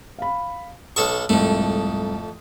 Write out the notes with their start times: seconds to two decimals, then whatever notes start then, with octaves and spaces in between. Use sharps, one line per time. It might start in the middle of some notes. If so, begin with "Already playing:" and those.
0.18 F5 B5
0.96 B1 A4 C#6 D#6
1.29 C2 F2 G#2 A3